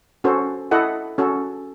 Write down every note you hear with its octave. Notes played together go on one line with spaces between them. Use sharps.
C#4 F#4 A4 C5
E4 A4 D#5 F#5
C#4 F#4 A4